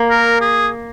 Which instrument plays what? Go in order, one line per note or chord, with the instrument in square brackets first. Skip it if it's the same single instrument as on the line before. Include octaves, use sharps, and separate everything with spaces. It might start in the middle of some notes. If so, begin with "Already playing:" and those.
Already playing: [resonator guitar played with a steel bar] A#3
[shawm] A#4
G#4